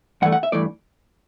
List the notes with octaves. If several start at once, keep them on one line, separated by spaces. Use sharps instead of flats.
G2 E3 A3 F#5
F#5
E5
G2 E3 A3 D5